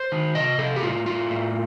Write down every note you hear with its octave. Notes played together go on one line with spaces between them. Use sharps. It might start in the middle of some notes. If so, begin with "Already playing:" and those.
Already playing: C5
D#3
C3 D#5
C3 A4
G4
A2 F4
A3 F4
A2